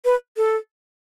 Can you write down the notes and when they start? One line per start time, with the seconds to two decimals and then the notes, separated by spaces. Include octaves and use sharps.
0.05 B4
0.37 A4